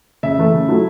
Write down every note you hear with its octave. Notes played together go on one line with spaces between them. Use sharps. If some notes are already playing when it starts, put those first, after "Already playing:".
C#3 E5
E3 A3
C#3
F#3 A3 E4